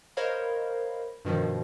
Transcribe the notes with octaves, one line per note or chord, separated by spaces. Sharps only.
A#4 C5 C#5 D#5 F5 B5
G2 B2 D#3 F3